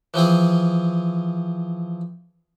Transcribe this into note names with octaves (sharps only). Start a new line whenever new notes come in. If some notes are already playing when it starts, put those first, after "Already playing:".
E3 F3 C4 G#4